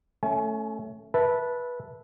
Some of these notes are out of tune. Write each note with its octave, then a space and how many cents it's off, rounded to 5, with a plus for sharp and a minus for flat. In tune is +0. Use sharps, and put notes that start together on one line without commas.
A3 +0 C#4 +0 G#5 +40
B4 -15 E5 +0 A5 -5